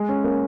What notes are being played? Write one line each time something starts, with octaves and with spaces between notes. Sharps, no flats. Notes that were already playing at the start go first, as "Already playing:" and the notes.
Already playing: G#3
C#4
A#3 C#4